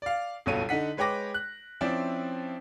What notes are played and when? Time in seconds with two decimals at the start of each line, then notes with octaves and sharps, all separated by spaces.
0.02 D5 F5
0.46 G1 C#2 B2 A4 C#5 D#7
0.69 D3 D#4 F#5 B6
0.97 G#3 B4 C#5 G5 D6 A#6
1.34 F#6
1.81 F3 C4 C#4 E4 D5 E5